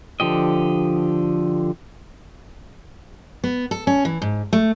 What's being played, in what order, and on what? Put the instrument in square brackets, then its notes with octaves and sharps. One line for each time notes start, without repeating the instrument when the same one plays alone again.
[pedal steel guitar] D3 F3 G4 D#5
[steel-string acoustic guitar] B3
A4
C#4
E3
G#2
A3